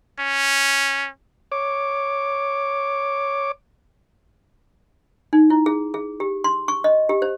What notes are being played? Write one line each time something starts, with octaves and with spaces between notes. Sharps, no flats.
C#4
C#5 D6
D#4
E4
G#4
G#4
G4
C6
C#6
D#5
G4
C5